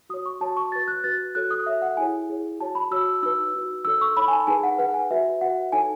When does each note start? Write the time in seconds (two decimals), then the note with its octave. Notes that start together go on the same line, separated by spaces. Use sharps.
0.09 F#4 C#5 D#6
0.26 C#6
0.41 F#4 C#5 A5
0.57 C#6
0.72 F#4 B4 A6
0.88 F#6
1.04 F#4 B4 A6
1.35 F#4 A4 C#5 F#6
1.51 D#6
1.66 F#4 A4 C#5 E5
1.82 F#5
1.97 E4 G#4 C#5 G#5
2.29 E4 G#4 C#5
2.59 F#4 C#5 A5
2.75 B5
2.91 F#4 C#5 E6
3.23 D#4 F#4 B4 E6
3.54 D#4 F#4 B4
3.85 D#4 A4 C#5 E6
4.01 C#6
4.17 D#4 A4 C#5 B5
4.28 G#5
4.32 A5
4.47 D#4 G#4 B4 G#5
4.63 F#5
4.78 D#4 G#4 B4 F#5
4.94 G#5
5.11 F#4 B4 E5
5.41 F#4 B4 F#5
5.72 D#4 A4 C#5 G#5